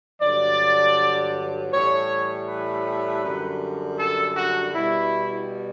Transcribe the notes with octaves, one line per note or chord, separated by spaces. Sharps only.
G2 D3 F#3 D5
A2 E3 G3 C#5
B4
F#2 D3 G3
A4
F#4
B2 G3 E4